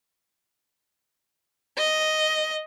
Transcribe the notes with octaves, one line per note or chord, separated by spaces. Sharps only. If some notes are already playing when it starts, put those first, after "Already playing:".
D#5